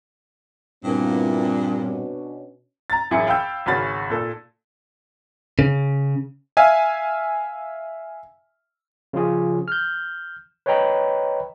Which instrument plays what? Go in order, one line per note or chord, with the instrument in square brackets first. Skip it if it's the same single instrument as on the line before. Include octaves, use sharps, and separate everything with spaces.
[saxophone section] G2 A#2 [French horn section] B3 E4 F#4 [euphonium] C4
[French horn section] B2 C#4 D4
[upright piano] A#5 A6
A1 F#2 E4 G#4 C#7
F5 G5 B5 E6 G6
G#1 C#3 C#4 F#4 B5 A6
A#2 A4
[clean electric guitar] C#3
[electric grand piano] E5 F5 G#5
[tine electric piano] C#3 F3 F4 G#4
F6 G6
B4 C#5 D#5 G5 A#5 B5